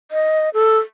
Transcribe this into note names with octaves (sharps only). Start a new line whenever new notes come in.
D#5
A4